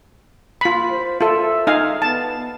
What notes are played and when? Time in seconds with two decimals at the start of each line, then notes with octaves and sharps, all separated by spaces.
0.61 F4 B5
0.90 C5
1.21 F4 A4 E5
1.67 D#4 F5 G#5
2.02 B3 A5